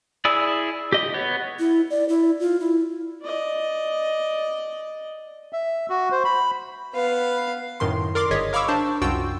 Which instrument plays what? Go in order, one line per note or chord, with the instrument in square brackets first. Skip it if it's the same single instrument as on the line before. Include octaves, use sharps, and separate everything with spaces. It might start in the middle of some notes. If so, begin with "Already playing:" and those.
[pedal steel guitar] E4 G#4 D5 E6
G4 D#5
B3 C#5
[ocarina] E4
D5
E4
F4
E4
[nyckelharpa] D5 D#5
[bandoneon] E5
F#4
C5
B5
[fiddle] B3 F5 [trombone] B4
[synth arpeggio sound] F#2 A2 D#3 C6
A#4 D5 C6 D6
G1 G#4 C#5 D#5 B6
A#4 F5 B5 C#6 D6 E6
D4 C5 A5
C2 F#2 F4 F#4 G5 E6